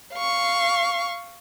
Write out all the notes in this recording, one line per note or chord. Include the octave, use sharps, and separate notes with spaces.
F5 C#6